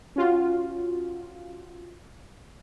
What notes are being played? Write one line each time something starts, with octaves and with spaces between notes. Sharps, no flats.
C#4 F4 F#4